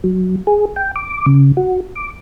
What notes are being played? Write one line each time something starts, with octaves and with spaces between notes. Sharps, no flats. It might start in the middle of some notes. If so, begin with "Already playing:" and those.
F#3
G#4
G5
D6
C#3
F#4
D6